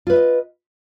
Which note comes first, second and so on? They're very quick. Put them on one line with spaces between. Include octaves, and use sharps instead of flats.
F4 B4 E5 D#5